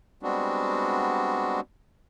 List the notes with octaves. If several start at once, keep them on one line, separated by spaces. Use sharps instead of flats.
G3 G#3 B3 C4 D4 F#4